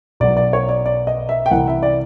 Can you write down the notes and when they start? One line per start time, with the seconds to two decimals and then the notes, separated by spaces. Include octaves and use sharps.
0.20 B1 B2 F#3 D5
0.37 D5
0.53 C#5
0.69 D5
0.86 D5
1.07 D#5
1.29 E5
1.46 G5
1.50 C2 C3 E3 F#5
1.68 E5
1.83 D5